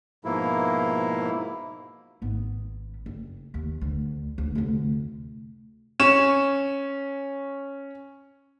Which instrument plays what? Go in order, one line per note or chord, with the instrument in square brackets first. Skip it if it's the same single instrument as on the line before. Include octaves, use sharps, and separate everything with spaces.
[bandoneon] G#2 B2 F3 A#3 E4
[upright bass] G#1 B3
F#1
D#2
D2
D2
F1 D2
[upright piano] C#4 C#6 E7